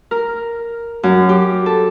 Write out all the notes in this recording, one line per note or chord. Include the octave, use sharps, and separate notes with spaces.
A#4
F#2
G4
A4